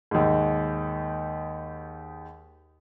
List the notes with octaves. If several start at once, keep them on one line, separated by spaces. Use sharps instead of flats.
D#2 G#2